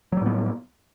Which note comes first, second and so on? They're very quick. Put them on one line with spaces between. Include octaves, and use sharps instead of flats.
F#3 G3 A2 B3